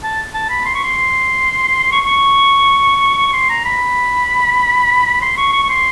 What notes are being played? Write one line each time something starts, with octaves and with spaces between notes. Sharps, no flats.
A5
A5
B5
C6
C#6
C6
C#6
C#6
C#6
C6
A#5
B5
B5
C6
C#6
C#6
C#6
C6